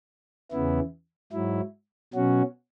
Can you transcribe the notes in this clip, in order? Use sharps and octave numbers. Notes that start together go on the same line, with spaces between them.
E2 C#3 E3 B3 E4
G#2 F#3 E4
B2 F#3 C#4 F#4